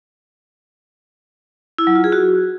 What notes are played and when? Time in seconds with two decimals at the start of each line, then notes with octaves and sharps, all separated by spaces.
1.78 E4
1.87 F#3
1.95 F4
2.04 G#4
2.12 F#4